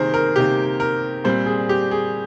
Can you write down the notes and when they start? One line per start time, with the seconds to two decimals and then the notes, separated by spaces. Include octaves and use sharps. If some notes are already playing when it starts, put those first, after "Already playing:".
Already playing: C3 D#3 A#3 G#4 A#4 C5
0.14 A#4
0.36 C3 D#3 A#3 G4
0.80 A#4
1.24 A#2 G3 C4 C5
1.46 G#4
1.69 G4
1.91 G#4